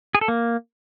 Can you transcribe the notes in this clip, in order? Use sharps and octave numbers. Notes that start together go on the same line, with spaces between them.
G#4
A4
A#3